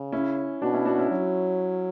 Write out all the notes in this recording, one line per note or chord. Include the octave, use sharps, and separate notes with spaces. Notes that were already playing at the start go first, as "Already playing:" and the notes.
Already playing: C#3
C#4 E4
B2 D4 F#4
C#4 E4
D4 F#4
C#4 E4
F#3